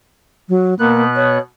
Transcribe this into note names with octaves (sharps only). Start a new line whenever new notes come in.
F#3
B2 A#3 B3 F#6
C#5